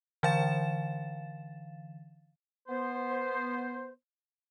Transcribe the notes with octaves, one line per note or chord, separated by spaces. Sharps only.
D3 E3 F5 A6 E7
B3 C5